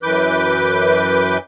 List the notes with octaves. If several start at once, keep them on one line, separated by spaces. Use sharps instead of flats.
F#2 E3 B4 D6 G6